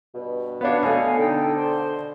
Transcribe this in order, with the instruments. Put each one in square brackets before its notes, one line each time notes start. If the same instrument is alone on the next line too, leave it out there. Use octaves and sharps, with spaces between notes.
[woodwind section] G2 B2
[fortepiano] B3 D4 [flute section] C#5 F5 F#5
[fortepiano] B2 A3 [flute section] C#5 F5 G#5
[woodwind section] D3 [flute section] D#4 A4 G5
[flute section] C5